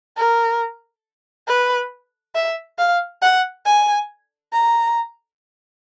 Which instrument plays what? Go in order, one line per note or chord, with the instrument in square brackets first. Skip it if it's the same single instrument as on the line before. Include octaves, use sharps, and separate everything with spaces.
[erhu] A#4
B4
E5
F5
F#5
G#5
A#5